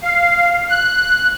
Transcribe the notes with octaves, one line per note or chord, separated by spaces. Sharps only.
F5
F#6